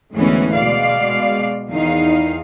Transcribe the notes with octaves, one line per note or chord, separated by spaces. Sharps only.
D2 G#2 E3 A3 B3 C#4
B2 G#3 D5 F5
E2 D#3 D#4 F5